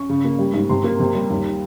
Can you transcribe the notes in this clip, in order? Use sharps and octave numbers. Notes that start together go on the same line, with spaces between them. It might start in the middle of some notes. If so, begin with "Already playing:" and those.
Already playing: C#4 C#6
C#3
A#3
G3
G#2
C3 C6
A#3
C3
G3
D#2